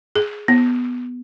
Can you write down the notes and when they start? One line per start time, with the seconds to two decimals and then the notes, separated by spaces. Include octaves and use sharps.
0.16 G#4
0.48 B3